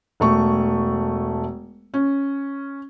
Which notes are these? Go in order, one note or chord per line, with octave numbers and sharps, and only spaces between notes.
E1 A3 C#6
C#4